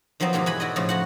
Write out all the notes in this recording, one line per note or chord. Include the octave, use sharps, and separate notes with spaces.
D#3 F3 F#3 B3 C4
G#2 B2 E3 A#3 G4
E2 B4 D#5 G#5 B5
E4 F#4 D5 D#5
A2 C#3 F3 A3
F2 F#4 F#5